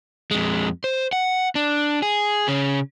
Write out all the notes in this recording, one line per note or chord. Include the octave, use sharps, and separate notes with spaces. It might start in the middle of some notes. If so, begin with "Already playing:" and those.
F2 G#3
C5
F#5
D4
G#4
C#3 C#4